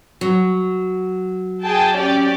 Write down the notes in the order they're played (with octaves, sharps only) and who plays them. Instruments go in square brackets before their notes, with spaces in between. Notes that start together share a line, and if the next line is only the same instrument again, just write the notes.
[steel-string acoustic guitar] F#3
[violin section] G#4 G5 A5
C#4 G4 D5